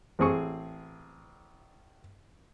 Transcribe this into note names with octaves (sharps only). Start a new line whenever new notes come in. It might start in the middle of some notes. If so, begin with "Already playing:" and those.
A1 C4 G#4 C#6